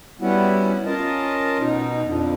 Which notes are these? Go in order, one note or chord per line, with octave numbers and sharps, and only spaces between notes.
G3 B3 C#4 E4 F#4
C#4 F4 A#4 D#5 A5
B2 D#4
F2 D3